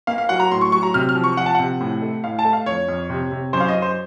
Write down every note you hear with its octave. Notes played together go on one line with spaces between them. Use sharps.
A#3 F5
F5
F#3 F#5
A#5
A2 C6
C#6
F#3 C#6
A#5
C3 F6
F6
F3
C#6
F3 F#5
A5
C3 F#5
A2
A3
A2 F5
A5
A3
F5
F2 C#5
F2
C3
C3
F#2 C5
F5
D#5
F#2
C5